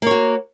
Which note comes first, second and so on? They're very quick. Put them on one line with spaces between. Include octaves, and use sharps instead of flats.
A#3 C#5 F#4